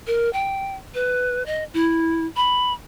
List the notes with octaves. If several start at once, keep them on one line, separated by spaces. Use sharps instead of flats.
A#4
G5
B4
D#5
E4
B5